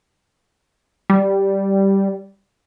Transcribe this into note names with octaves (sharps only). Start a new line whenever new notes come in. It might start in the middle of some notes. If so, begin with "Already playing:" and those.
G3